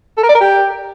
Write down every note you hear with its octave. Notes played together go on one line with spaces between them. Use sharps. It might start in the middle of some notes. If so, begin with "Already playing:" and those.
A4
A#4
D5
A#4
G4